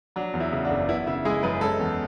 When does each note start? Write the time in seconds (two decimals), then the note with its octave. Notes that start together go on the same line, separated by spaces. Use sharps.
0.16 F#3 D4
0.34 E2
0.40 E4
0.52 C#3
0.65 D4 F#4
0.71 F#1
0.88 B3 E4
1.07 C#3 E4
1.25 G#3 E4 G#4
1.43 F#2 G#4 B4
1.61 G#3 A4 C#5
1.80 E2